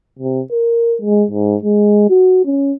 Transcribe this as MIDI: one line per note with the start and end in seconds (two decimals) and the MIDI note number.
0.19 0.41 48
0.51 0.96 70
1.02 1.25 56
1.31 1.56 44
1.63 2.07 56
2.10 2.41 66
2.45 2.73 61